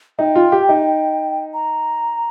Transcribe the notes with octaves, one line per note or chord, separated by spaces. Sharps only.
D#4 G5
F4
G4
D#4
A#5